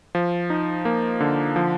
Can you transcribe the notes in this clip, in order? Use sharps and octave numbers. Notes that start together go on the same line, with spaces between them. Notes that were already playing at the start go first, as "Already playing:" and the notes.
F3
D#4
A#3
D3
F3